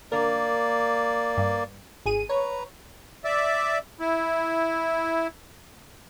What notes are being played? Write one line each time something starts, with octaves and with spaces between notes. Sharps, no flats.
D3 A#3 A#4 D5
G2
G#1 G#4 D#7
B4 C#5 A#5
D5 E5
E4